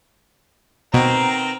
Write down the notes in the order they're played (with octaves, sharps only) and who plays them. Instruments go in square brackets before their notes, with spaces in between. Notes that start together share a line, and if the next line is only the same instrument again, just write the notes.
[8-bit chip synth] B2 [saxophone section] D#3 B3 C4 [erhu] A#5